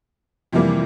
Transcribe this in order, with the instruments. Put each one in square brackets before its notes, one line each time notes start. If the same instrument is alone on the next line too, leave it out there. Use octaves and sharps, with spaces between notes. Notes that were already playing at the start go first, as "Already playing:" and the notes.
[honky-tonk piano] F2 C3 E3 G3 A#3